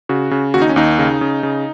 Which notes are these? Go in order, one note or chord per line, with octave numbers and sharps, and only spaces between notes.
C#3 F#4
C#3
D#2 F#4
D#4
C#4
D#2 D#4
C#3
C#3
C#3